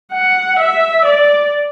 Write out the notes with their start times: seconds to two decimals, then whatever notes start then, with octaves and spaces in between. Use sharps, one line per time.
0.12 F#5
0.59 E5
1.06 D5